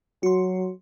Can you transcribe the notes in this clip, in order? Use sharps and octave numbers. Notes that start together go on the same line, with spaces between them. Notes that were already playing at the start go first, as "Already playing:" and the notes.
F#3 F#4 C6